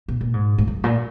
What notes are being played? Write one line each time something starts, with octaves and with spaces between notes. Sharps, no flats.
B2
A#2
G#2
G#2
F#2
A#2